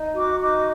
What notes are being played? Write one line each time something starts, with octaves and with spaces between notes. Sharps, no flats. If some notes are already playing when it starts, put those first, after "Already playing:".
Already playing: D#4
F#4 D6
D#4 D6